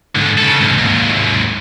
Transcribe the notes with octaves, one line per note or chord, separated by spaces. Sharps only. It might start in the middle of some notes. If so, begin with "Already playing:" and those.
G#2 D3
C#3 A4
C2 G#2
D#2 G#2